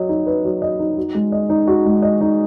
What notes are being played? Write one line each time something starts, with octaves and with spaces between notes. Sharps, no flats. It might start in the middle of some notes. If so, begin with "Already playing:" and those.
Already playing: F#3 D#5
D#4
B4
F#3
D#5
D#4
F#4
G#3
D#5
D#4
F#4
G#3
D#5
D#4